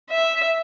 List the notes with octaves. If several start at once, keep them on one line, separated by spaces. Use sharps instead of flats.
E5